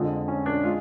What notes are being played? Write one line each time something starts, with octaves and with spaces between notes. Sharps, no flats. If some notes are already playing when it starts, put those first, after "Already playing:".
Already playing: F2 D3 F3 G#3
C#4
D4
G#3 F4